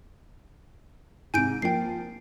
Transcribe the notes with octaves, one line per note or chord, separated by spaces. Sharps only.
G#2 C3 G#5 G6 D7
F3 A#3 F4 G5 C7